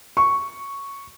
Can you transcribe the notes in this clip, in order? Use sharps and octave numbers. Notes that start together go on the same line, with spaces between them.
C#6